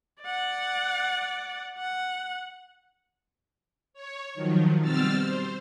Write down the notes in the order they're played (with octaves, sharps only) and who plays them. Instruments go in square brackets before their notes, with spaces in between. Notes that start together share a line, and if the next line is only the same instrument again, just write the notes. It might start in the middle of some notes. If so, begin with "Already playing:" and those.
[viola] D5 F#5
F#5
[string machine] C#5
D#3 F3 F#3
B2 G3 C4 E6 F6 A6
C5